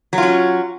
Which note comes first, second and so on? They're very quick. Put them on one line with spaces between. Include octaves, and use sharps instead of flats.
F#3 F4 C#4